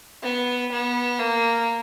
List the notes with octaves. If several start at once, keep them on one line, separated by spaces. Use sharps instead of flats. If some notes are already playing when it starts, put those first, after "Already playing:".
B3
B3
A#3